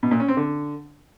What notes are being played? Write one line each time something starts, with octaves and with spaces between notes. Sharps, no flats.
B2
A#2
C#4
C4
D3